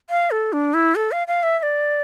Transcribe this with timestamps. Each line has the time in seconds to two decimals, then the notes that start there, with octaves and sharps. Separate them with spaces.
0.10 F5
0.31 A4
0.53 D4
0.74 E4
0.95 A4
1.12 F5
1.28 F5
1.43 E5
1.59 E5
1.63 D5